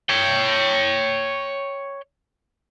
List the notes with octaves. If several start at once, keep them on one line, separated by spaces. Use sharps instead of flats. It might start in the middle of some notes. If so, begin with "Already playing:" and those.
C#5 G5